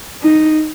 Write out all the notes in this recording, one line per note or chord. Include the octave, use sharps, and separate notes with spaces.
D#4